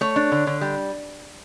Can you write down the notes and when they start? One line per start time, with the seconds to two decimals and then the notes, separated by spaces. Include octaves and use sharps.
0.01 A3 C#5
0.16 D4
0.32 D3
0.47 D3
0.61 G3